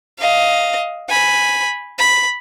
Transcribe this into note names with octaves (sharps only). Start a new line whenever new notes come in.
D#5 F5
G#5 B5
B5